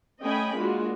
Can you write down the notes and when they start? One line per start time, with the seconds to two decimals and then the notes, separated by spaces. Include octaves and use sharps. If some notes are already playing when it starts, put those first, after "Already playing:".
0.23 A3 C#4 D#5 G5 G#5 B5
0.58 G#3 A#3 D4 F4 F#4